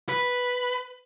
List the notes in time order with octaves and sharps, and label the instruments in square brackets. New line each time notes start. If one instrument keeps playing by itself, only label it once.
[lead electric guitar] B4